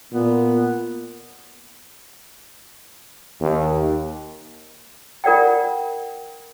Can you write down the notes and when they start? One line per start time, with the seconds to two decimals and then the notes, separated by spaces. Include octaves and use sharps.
0.12 A#2 B3
3.41 D#2
5.24 F4 A#4 D5 F#5 G5